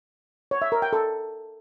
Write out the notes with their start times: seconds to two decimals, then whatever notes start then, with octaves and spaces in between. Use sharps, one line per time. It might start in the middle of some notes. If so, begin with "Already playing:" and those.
0.51 C#5
0.62 E5
0.72 A#4
0.82 G5
0.93 A4